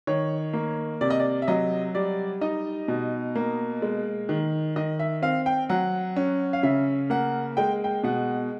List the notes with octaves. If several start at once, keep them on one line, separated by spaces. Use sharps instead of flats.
D#3 C#5
A#3
C3 D5
D#5
D5
E5
F#3 D#5
G3 D5
D#4 D#5
B2
A#3
G#3
D#3
D#3 D#5
E5
C4 F5
G5
F#3 F#5
C#4
F5
C#3 E5
A#3 F#5
G#3 G5
G5
B2 F#5